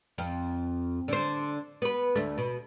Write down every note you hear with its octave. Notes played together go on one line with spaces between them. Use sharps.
F2
D3 C5
B3 B4
D2 A3
B2